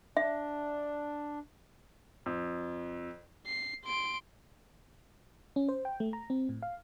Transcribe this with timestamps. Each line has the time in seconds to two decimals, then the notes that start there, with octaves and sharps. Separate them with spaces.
0.17 D4 E5
2.26 F2
3.46 C7
3.85 C6 D7
5.56 C#4
5.69 C5
5.85 G5
6.00 A3
6.13 A#5
6.30 C4
6.49 A2
6.62 F5